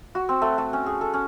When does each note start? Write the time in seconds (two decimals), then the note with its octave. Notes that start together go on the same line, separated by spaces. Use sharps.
0.15 F#4
0.29 C4
0.42 A3
0.58 A3
0.73 C#4
0.86 G#4
1.01 A4
1.14 C#4